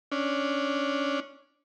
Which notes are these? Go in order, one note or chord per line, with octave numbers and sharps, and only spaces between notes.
C#4 D4